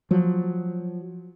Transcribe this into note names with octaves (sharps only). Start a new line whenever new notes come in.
F3 F#3